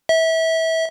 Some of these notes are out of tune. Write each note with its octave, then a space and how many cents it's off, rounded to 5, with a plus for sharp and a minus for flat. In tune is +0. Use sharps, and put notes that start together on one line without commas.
E5 -25